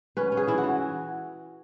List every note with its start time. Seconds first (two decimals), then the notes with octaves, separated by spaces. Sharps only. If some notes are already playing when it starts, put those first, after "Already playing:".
0.17 C#4 B4
0.32 C#4
0.37 G#4
0.47 E3 E4
0.58 F#4
0.63 E3